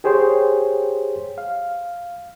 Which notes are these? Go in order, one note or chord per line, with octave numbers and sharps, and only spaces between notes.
G4 G#4 C5 C#5 G5 C6
F5